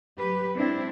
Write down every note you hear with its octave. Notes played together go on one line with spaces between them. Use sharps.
F#3 G4 B4
G#2 C4 D4 E4